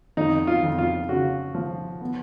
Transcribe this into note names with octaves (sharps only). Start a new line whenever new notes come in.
F2 D#4
F4
F2
F4
C#3 F#4
F3
B3